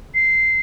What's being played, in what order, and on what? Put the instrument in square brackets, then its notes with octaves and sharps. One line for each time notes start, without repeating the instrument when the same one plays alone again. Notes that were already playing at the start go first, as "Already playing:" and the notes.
[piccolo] C7